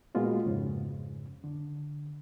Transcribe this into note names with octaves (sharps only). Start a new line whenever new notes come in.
A#2 G#3 A#3 B3 F4 F#4
F2 G#2 C#3
D3